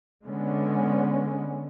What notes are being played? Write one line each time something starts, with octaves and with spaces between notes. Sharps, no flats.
D3 G#3 B3 C#4